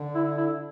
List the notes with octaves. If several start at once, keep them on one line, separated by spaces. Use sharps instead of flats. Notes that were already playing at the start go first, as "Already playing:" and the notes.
Already playing: D3
E4
E4